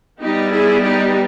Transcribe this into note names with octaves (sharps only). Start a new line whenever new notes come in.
G3 B3 D#4 G4
E4 G#4
D#4 G4